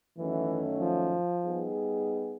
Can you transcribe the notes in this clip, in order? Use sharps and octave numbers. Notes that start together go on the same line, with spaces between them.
F#2 D#3 E3 F#3 A3 C#4
F3
G3 B3 D#4 G#4